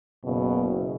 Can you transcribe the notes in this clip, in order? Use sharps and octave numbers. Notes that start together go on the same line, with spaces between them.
F#1 B2